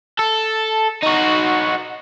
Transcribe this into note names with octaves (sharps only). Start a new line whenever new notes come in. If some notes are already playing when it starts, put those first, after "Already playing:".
A4
D#4 F#4